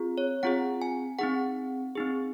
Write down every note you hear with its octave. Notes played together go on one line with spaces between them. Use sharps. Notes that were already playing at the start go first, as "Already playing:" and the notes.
Already playing: C4 F4 G#4
C#5
C4 F4 G#4 F#5
G#5
C4 D#4 G#4 F#5
C4 D#4 G#4